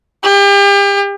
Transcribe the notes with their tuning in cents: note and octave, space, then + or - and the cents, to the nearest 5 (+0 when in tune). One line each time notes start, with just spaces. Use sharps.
G4 +35